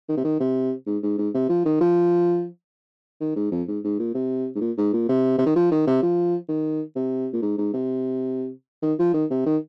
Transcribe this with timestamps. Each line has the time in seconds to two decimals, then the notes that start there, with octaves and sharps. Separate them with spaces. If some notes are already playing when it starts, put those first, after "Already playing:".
0.09 D#3
0.17 C3
0.24 D#3
0.40 C3
0.87 G#2
1.03 G#2
1.18 G#2
1.34 C3
1.49 F3
1.65 D#3
1.81 F3
3.21 D#3
3.36 G#2
3.52 F2
3.68 G#2
3.84 G#2
3.99 A#2
4.15 C3
4.55 G#2
4.61 A#2
4.78 G#2
4.93 A#2
5.09 C3
5.38 C3
5.46 D#3
5.56 F3
5.71 D#3
5.87 C3
6.03 F3
6.49 D#3
6.96 C3
7.33 A#2
7.42 G#2
7.58 G#2
7.73 C3
8.83 D#3
8.99 F3
9.14 D#3
9.31 C3
9.46 D#3